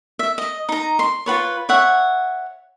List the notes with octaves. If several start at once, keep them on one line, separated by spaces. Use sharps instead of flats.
E5
D#5
D#4 A#5
C6
F4 F#4 B4 C#5
C#5 E5 F#5